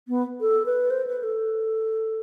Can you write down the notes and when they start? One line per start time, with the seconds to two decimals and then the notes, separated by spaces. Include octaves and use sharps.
0.08 B3
0.41 A4
0.66 B4
0.90 C5
1.07 B4
1.23 A4